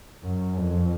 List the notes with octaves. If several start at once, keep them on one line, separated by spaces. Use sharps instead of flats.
F#2
F2